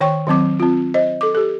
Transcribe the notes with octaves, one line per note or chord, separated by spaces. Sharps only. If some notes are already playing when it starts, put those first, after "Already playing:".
D#3 C#5 G5 C#6
D#3 F#3 C4 D6
C4 F4
C5 D#5
A4 D6
G4 A4